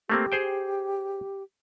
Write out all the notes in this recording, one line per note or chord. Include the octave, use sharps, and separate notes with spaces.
A3 A#3 C4 G4
G#4 C5 G5